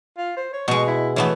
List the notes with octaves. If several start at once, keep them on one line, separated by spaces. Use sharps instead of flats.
F4
C5
C#5
B2 G#3 C#6
E4
E3 A3 B3 C#5